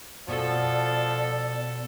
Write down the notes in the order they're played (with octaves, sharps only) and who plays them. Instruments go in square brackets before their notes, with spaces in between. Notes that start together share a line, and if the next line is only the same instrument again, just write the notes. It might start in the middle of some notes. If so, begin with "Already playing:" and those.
[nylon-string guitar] B2 [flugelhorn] F3 [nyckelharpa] A4 [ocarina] D5